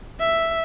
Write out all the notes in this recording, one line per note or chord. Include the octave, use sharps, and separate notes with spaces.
E5